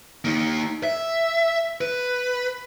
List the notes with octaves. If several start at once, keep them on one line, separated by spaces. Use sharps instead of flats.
A#3 D#4
E5
B4